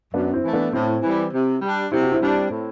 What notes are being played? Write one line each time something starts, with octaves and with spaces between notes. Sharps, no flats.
F#2 B3 D4
C4 E4
E3 A3
B3 D4
A2 C4 E4
E3 G3
C3
G3 D4
C3 E4
F#4
C4 E4
G3 D4
A2